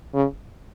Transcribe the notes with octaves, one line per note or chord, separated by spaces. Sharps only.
C#3